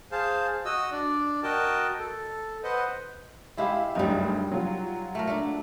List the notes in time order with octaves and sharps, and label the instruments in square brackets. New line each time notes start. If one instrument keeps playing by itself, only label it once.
[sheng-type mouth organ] G#4 C5 F5 A5
F#4 D#5 D#6 E6
D4 D5
F#4 A#4 D#5 G5 A5
A4
B4 C5 D#5 F#5
[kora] G#3 E4 G4 [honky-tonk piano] E5 F5
[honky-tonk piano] F#1 D2 G2 [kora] G3 D#4
[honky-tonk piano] F#3 F4
[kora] A3 A#4
A3 D4